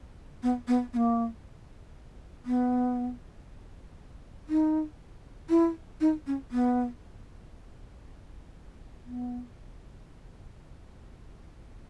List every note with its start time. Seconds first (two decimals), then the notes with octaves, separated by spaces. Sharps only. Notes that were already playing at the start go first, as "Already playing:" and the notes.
0.43 B3
0.68 B3
0.93 B3
0.97 A#3
2.46 B3
4.49 D#4
5.50 E4
6.01 D#4
6.27 C#4
6.51 B3
9.06 B3